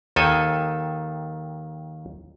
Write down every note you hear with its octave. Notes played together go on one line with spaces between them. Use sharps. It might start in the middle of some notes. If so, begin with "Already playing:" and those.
D#2 D#3 A4 G#5